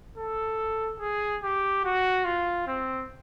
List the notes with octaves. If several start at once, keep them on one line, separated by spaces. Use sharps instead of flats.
A4
G#4
G4
F#4
F4
C4